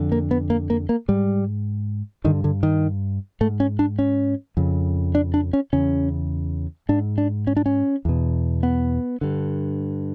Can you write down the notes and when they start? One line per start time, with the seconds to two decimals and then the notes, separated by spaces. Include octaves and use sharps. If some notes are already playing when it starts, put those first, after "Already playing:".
Already playing: F2 D3
0.12 A#3
0.31 B3
0.50 A#3
0.70 A#3
0.89 A#3
1.08 G#2 G3
2.24 G2 D3 D#3
2.44 D3
2.63 D#3
3.41 G#2 A3
3.60 C#4
3.79 D4
3.99 C#4
4.57 F2 C#3
5.15 D4
5.34 D4
5.53 C#4
5.73 E2 C#3 C#4
6.89 G#2 D4
7.18 D4
7.47 C#4
7.57 D4
7.66 C#4
8.05 E2 B2
8.63 B3
9.21 G2 D3